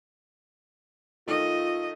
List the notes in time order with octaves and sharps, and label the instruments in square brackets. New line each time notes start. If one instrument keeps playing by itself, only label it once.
[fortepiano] D#3 A3 [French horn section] F4 [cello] D#5